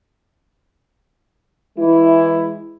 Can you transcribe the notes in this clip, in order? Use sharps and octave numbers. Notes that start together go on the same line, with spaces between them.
E3 G#3 E4